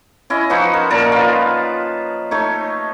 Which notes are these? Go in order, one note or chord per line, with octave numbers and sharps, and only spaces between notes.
C#4 E4 D#5
F3 D#4 F#4 B4
A#4
A#2 A#4 A5
F4 B4
A3 D#4 C#5